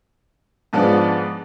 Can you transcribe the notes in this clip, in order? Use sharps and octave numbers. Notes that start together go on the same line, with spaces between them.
G#2 F3 G#3 B3 D4